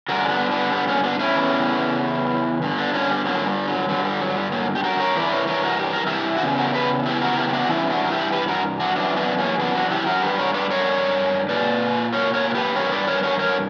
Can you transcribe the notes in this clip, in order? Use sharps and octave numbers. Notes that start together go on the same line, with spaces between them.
G2 D3 F#4 A#4
C#4
B3 D4
B3 D4
G3 B3
A#3 C#4
B3 D4
C#4 E4
E2 C#3 E3
G2 D3
B3 D4
A#3 C#4
G3 B3
F#3 A#3
G3
F#3
G2 D3 F#3
G3
F#3
G3
F#3 A#3
G4
F#4 A#4
A#4 C#5
G2 E3 B4 D5
A#4 C#5
A#4 C#5
F#4 A#4
G4
A#4
E4 G4
F#4
E2 C#3 G4
F#4 A#4
G4 B4
E4 G4
F#4 A#4
E4 G4
G4
D4 F#4
G2 E3 C#4 E4
E4
D4 F#4
A#4
E4 G4
G4 B4
F#4 A#4
D4 F#4
F#2 E3 D4 F#4
B3 D4
A#3 C#4
B3 D4
D4 F#4
E4 G4
F#4 A#4
G2 D3 G4 B4
A#4 C#5
B4 D5
A#4 C#5
A#2 B4 D5
A#4 C#5
A#4 C#5
C#5
G4 B4
G2 E3 A#4 C#5
B4 D5
A#4 C#5
A#4 C#5
A#4 C#5